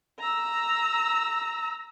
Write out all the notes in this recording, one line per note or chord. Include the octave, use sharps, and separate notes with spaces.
A#5 E6